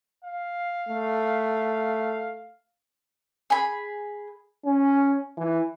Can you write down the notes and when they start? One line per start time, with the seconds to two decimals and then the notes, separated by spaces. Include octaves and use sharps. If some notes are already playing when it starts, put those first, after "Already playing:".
0.25 F5
0.89 A3
3.50 G#4 B5
4.65 C#4
5.37 E3